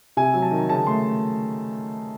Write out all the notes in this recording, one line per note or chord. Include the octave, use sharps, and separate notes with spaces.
C3 G#5
F#3
A5
D#3
C#3 A5
A3 C6